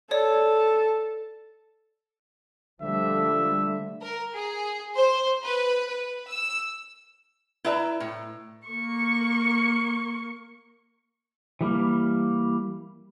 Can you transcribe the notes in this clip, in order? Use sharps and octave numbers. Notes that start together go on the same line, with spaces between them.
A4 C#5 D5
D3 F3 G3 A3 E5
A#4
G#4
C5
B4
B4
E6
E4 B4 D5 E5 A5 A#5
A2
A#3 C#6
E3 G3 A#3